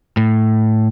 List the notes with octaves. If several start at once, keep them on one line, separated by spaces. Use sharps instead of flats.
A2